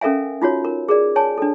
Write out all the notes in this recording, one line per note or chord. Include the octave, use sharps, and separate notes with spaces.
C#4 A4 A#4 E5 F5 G#5
D#4 F4 F#4 C#5
A#4
G#4 A#4 D5
C#5 G#5 A5
D4 A4